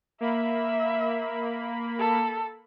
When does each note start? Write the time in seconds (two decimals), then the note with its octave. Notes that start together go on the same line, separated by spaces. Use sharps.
0.21 A#3 E5 B5
1.99 A4